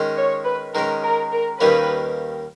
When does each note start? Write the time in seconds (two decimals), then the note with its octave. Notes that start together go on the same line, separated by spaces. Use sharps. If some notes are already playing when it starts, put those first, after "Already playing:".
Already playing: D#3 G#3 C#4
0.17 C#5
0.45 B4
0.74 D#3 G#3 C#4 A#4
1.03 A#4
1.32 A#4
1.60 D#2 D#3 G3 A#3 C#4 B4